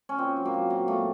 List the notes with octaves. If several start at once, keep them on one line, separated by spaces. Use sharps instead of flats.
C#4
A#2 C4
F#3
A#3
F#3
A#2 A#3
A#2 A3